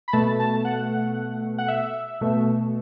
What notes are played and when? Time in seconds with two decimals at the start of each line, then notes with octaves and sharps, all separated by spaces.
0.08 B5
0.13 B2 A3 A5
0.39 A5
0.65 F#5
1.58 F#5
1.68 E5
2.21 B2 A3